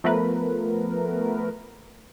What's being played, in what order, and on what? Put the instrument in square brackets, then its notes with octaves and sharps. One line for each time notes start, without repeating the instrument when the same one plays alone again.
[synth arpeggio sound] F3 A3 B3 A#4 B4